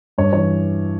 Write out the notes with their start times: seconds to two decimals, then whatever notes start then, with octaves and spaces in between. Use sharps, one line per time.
0.18 G2 C#5
0.33 E3 C#5